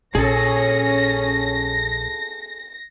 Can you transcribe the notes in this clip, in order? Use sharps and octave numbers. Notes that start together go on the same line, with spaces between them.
A#1 C#4 G#4 A4 A#6